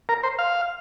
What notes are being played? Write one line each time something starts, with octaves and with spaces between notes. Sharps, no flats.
A#4
C5
F5